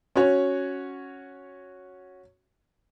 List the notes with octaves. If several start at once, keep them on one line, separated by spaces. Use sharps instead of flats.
C#4 F#4 C#5